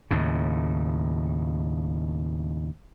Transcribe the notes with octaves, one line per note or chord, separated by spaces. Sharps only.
D#2 A2 C#3